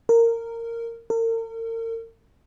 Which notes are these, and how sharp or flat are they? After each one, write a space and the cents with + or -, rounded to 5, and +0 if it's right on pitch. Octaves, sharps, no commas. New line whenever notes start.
A#4 -15
A#4 -40